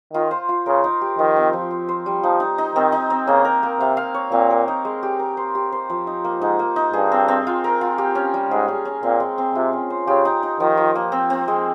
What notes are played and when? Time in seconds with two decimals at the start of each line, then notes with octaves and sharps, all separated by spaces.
0.14 D#3 F4
0.31 C5
0.49 F4
0.66 C#3 A#4
0.84 D#4
1.01 G4
1.18 D#3 F3
1.37 C4
1.53 F3
1.71 C5
1.89 C5
2.06 G3
2.23 F3 D#4
2.40 D#4
2.58 D#4
2.76 D#3 C4
2.92 D#4
3.10 C4
3.27 C#3 A#3
3.45 A#4
3.63 A#3
3.80 C3 F5
3.97 F5
4.14 C#5
4.32 A#2 C4
4.50 A#4
4.68 D#4
4.85 G#3
5.03 G4
5.19 A#4
5.37 C5
5.55 G4
5.72 C5
5.90 F3
6.07 D#4
6.25 A#3
6.41 G#2 D#4
6.59 A#3
6.76 D#4
6.93 G2 G#4
7.12 C4
7.28 C4
7.47 F4
7.64 A#4
7.81 F4
7.98 G4
8.15 C#4
8.34 G3
8.51 G#2 G#4
8.68 C#4
8.85 C#4
9.03 A#2 C4
9.20 G#3
9.38 C4
9.55 C3 F4
9.73 C#4
9.90 C5
10.07 C#3 G4
10.25 D#4
10.43 D#4
10.60 D#3 F3
10.77 F3
10.95 A#3
11.12 C4
11.30 C4
11.48 G#3